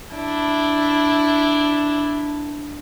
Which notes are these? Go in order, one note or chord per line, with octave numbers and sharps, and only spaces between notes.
D4 E4